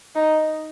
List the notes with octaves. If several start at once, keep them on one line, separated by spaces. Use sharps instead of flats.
D#4